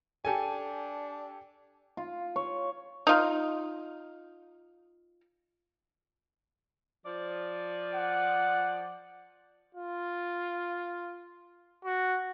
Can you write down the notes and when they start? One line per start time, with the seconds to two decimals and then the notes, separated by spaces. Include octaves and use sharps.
0.25 D4 G4 A4 G#5
1.97 F4
2.36 C#5
3.07 D#4 F4
7.05 F3 D5
7.95 F#5
9.75 F4
11.84 F#4